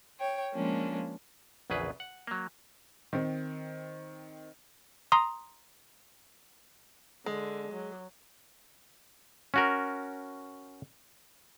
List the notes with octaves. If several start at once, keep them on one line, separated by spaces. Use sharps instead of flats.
C#5 G5
F3 G#3 A#3 C#4 D4
A#1 E2 C#3 G#4 B4
F#5
F#3 A#3
D#3 C4
A#5 C6 D#6
D3 G#3
F#3
C#4 F#4 A#4